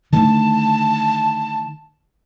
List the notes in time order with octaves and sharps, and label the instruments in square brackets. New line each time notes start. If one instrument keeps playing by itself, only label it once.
[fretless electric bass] D3 D#3 A3 [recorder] A5